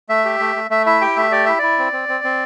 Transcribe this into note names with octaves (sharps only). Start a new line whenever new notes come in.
A3 E5
G4
A3
A3
A3 E5
E4 E5
G4 G5
A3 E5
G4 D5
E4 E5
E4 D5
C4
C4
C4
C4